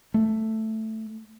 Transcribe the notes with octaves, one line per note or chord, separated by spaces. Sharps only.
A3